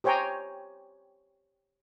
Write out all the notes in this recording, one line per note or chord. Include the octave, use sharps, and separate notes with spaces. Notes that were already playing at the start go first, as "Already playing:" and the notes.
G4 C5 C#5 G5 G#5 A#5